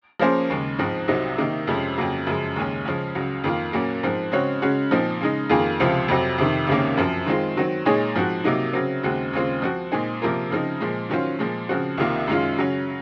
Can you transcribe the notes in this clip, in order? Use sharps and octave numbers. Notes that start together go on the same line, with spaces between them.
F3 A#3 C#4 G#4 C5
D#2 C#3 G#3
G#2 F3 C4 D#4
C2 C3 F#3 C4 D#4
C3 D#3 A#3 D#4
F2 C3 F3 G#3 C#4
F2 C#3 F#3 A#3
F#2 C#3 F3 G#3
D#2 C#3 G#3 C#4 G#4
C#3 F3 G#3 C#4
C#2 C#3 F#3
F2 D#3 A#3 F4
A#2 F#3 A#3 C#4
G#2 F3 C4
C#3 G#3 C4 F#4 C#5
C#3 G#3 C#4 F#4
A#2 F3 C4 D#4
C#3 G#3 D#4
F2 D#3 A#3 F4 G#4
C#2 C3 F3 C4 F4
F2 C3 F#3 C4
F2 C3 D#3
C#2 C3 D#3 A#3 C#4
F#2 F3 C4
D#3 G#3 C4 F4
D#3 F#3 C4
A#2 G#3 D#4 G#4 C#5
G#2 F3 C4 F#4
C3 F#3 A#3 D#4
C#3 F#3 C4
D#2 C#3 G#3 C4 F#4
D#2 C#3 G#3 C4 F4
F3 C4 F#4
A#2 G#3 C4 D#4 G#4
C3 F3 A#3 F4 A#4
C#3 F3 C4 D#4
A#2 F3 G#3
D#3 F#3 C#4 F4 C5
A#2 F3 G#3
C#3 F3 C4 F#4
C2 C3 D#3 A#3 F4
F#2 D#3 G#3 C#4 F4
C#3 F#3 C#4